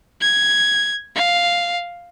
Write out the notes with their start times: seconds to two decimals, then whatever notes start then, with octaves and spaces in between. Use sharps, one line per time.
0.21 G#6
1.15 F5